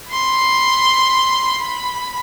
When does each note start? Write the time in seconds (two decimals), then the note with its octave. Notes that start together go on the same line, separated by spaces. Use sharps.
0.11 B5 C6
1.60 B5